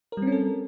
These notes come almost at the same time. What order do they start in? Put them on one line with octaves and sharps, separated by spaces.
A#4 G3 C4 C#4 A4